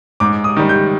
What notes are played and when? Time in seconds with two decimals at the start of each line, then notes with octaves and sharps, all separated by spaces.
0.20 G#2 D6
0.44 D#6
0.57 D#3 G3
0.69 G6